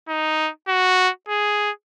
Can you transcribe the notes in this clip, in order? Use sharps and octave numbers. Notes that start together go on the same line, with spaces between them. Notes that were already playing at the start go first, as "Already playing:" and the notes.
D#4
F#4
G#4